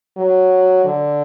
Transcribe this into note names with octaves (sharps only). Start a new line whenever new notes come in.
F#3
D3